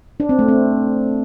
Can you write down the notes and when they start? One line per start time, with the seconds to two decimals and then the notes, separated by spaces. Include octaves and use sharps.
0.20 D4
0.29 C4
0.39 A3
0.48 C4